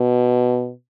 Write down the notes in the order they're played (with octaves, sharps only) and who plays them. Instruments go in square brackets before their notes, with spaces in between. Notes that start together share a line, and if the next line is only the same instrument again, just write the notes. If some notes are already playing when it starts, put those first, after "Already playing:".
Already playing: [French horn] B2